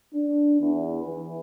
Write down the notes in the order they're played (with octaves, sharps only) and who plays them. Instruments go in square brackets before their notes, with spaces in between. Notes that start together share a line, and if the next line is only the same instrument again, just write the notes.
[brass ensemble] D4
E2
E3